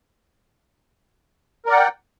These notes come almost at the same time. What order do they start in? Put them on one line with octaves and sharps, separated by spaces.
A#4 D5 F#5 G5